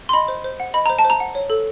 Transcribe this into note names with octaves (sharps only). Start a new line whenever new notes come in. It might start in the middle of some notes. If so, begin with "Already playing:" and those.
C6
D#5 B5
C5
C5
F#5
D#5 B5
C5 A#5
A5
C5
A#5
F#5
C#5
A4